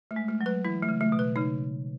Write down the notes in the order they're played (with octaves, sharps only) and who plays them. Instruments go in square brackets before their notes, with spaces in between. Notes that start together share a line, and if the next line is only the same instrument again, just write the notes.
[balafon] A3
[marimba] G#3
[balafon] A3
[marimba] F#3
[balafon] B4
[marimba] E3 [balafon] E4
[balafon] A3
[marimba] C#3
[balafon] A3
[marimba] B2
[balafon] B4
[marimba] C#3 [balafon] D#4